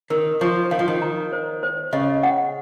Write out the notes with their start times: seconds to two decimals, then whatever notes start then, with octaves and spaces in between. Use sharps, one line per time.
0.10 D#3 A#4
0.41 F3 C#6
0.71 D#3 F5
0.79 F3
0.88 D#3
1.02 A#5
1.32 C5
1.63 C5
1.93 C#3 D#5
2.23 F#5